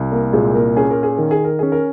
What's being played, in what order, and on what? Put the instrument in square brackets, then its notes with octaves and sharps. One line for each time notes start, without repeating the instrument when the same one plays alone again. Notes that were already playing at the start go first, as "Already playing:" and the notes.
Already playing: [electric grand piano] C2
[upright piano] A#3 A#4
[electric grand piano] A#2 [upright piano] G#3 G#4
[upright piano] A#3 A#4
[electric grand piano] C#4 [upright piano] G#4
[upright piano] A#4
G#4
[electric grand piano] D#3 [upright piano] A#4
[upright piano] G#4
A#4
[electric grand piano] C#4 [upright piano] G#4
[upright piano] A#4